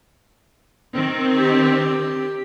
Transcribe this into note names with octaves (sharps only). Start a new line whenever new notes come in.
D#3 C4
G4